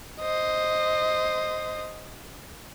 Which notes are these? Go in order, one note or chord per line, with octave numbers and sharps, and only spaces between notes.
C5 D#5